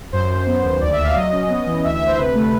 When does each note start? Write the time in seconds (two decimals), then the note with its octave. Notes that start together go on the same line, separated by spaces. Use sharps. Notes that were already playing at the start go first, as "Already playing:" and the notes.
0.13 F#2 C5
0.30 F#2
0.47 B3
0.64 D#2
0.81 D2 D5
0.93 E5
0.98 D2
1.04 F5
1.16 F#3 D#5
1.32 C#4
1.49 B3
1.66 E3
1.84 D2 E5
1.95 E5
2.01 D2
2.07 C5
2.18 C3 B4
2.35 A3